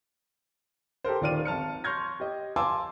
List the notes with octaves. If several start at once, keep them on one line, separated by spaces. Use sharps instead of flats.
G4 A4 A#4 C5
D#1 D#3 F4 D5 F6 D#7
G#1 A5 F6 C#7
C6 C#6 F6 G6 G#6 A#6
G4 D#5
F5 G#5 A5 C6 D6 E6